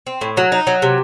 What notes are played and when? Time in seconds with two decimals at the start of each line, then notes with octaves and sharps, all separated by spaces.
0.07 C4
0.21 A2
0.37 F#3
0.52 D#4
0.67 F#3
0.82 C3